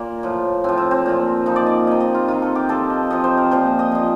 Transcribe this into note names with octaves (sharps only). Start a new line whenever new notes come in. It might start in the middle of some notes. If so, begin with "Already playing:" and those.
Already playing: A#2 A#3
A2 F3
A2 F3 C4
C4
C4
A#2 F3
A#2 F3 D#4
D5
D#5
C3 D#3 D#5
D#5
F4
C3 D#3 F4
A4
G4
C3 F3 A4
D#5
C3 F3 D#5
C5
A#4
A#2 F3 C5
D#5
A#2 F3